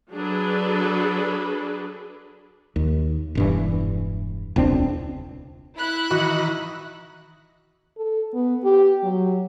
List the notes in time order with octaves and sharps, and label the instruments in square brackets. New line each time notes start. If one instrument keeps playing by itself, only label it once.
[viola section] F#3 D4 G#4 A4 B4
[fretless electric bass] D#2
E1 G2 E3
E1 C#2 C4 D4
[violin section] E4 B5 F#6
[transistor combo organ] D#3 E3 [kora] F#4
[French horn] A4
B3
G4
F#3